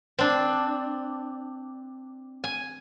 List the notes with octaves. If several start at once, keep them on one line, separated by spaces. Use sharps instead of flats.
C4 D4
G#5